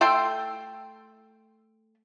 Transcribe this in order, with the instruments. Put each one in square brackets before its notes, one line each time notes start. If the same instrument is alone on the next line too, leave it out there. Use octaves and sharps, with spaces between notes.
[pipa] A3 E5 G5 C6